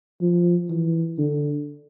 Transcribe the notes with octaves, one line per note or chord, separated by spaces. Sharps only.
F3
E3
D3